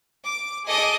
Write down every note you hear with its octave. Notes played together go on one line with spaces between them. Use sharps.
D6
G#4 A4 D#5 G#5 D6